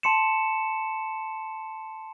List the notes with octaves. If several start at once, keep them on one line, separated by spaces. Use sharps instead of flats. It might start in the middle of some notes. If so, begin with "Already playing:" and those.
A5 C6 C#7 E7